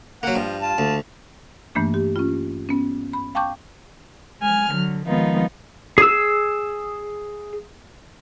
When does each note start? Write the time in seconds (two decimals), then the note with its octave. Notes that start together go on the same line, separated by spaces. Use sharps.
0.23 F#3 A#3 F#5
0.36 G2 F3
0.62 F4 A5
0.78 D2
1.75 G2 E3 A3 A#3 D4
1.94 G4
2.16 C#4 F4
2.69 B3 C#4
3.13 B5
3.35 F5 G5 A5 C#6 D6 G6
4.40 G#3 G#5 F6
4.70 D3 F#3
5.06 D#3 F3 G#3 B3 D#4 F4
5.98 G#4 E6